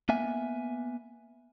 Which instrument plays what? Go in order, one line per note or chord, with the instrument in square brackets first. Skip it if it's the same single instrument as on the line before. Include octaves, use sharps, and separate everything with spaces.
[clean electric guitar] A#3 B3 E5 G#5